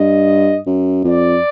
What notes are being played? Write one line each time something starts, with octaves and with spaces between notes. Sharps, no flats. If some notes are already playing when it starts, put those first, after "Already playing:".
Already playing: G2 D#5
F#2
F2 D5